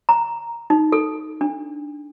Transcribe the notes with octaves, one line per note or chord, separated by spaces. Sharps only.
A#5
D#4
A4
D4